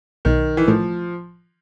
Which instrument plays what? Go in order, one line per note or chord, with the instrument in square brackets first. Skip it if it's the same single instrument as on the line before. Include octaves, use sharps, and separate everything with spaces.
[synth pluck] B1 [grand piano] D#3
[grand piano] E3
[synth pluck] A2 [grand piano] F3